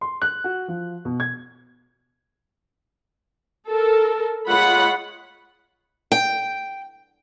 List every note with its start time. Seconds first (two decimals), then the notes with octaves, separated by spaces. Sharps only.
0.01 C6
0.22 F#6
0.44 F#4
0.68 F3
1.05 B2
1.20 G#6
3.70 A4 A#4
4.47 G#3 F4 C#5 F#5 B5
6.12 G5